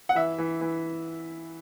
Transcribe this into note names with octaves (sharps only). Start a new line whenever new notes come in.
F#5
E3 E5
E3
E3